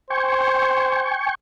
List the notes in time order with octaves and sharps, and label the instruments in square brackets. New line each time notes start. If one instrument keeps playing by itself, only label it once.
[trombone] C5 [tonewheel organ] G5 G#5 C#6